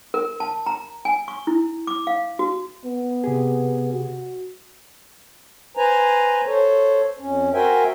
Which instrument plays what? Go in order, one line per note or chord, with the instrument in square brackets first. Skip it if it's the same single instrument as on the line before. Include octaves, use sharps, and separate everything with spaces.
[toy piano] A#4
A5
A#5
G#5
C#6
E4
D6
F5
F#4
[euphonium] B3
[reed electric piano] C3 G4 G#4
[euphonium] F#4
[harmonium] B4 C5 G#5 A#5
A4 C5 C#5
F2 C#4
F#4 A#4 C5 E5 G5 G#5